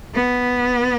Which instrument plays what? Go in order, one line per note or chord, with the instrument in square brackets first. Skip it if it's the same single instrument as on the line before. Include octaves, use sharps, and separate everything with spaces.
[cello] B3